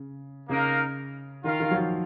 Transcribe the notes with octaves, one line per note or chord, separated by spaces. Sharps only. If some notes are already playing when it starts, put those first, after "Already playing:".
Already playing: C#3
C#3 A#3 D#4 A#4 F5
D#3 F4 A#4 F5
D#3
F#3
F3